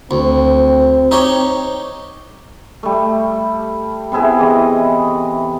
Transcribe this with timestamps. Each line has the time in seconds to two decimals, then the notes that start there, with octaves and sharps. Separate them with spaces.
0.11 D2 C4
1.11 D#4 G4 C#5
2.83 G3 A3
4.12 C3 B3 E4 G#4
4.39 E3 D#5